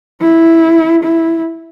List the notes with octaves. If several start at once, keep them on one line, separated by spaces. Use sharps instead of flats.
E4
E4